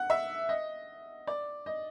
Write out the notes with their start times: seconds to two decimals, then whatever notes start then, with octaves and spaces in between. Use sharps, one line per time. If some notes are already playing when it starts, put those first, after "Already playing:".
Already playing: F#5
0.10 E5
0.49 D#5
1.27 D5
1.66 D#5